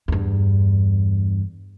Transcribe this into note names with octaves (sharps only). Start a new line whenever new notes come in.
E2 G2